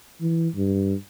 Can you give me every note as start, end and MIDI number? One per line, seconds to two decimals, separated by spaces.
0.21 0.48 52
0.55 0.94 43